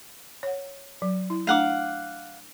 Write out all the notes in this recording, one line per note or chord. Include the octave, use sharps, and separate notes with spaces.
C#5 F#5
F#3
E4
A3 D4 F5 F#5 D6